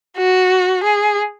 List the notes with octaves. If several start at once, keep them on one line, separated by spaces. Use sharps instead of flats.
F#4
G#4